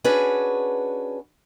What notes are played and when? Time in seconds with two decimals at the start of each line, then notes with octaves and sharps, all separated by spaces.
0.04 C#4 D4 F#4 G#4 B4